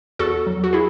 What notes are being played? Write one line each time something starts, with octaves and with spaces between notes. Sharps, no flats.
E2 F#4 A4
F#3
F#4
E4 G#4